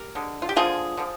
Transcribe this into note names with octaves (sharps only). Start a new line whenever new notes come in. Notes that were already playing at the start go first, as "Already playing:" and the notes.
Already playing: G4 A#4
D3 G#3
F4
G4
D3 F3 A#3 F4 G#4
D3 F3